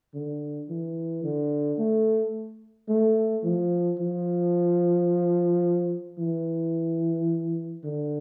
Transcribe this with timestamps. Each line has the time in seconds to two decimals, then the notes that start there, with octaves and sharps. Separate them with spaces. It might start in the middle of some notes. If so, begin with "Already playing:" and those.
0.14 D3
0.69 E3
1.24 D3
1.78 A3
2.89 A3
3.44 F3
4.00 F3
6.19 E3
7.84 D3